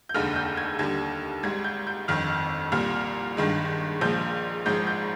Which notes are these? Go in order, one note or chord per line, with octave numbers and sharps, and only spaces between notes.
G6
F1 D#2 D3 G#3 F6
G6
G#6
D#2 D3 G3 G#6
G#1 G#2 G3 G#6
G6
G6
G1 F2 D#3 F6
C2 A#2 G3 F6
G1 G2 D#3 G#3
A#1 A#2 F3 G#3 G6
G#1 G#2 F3 G#3 G6
G6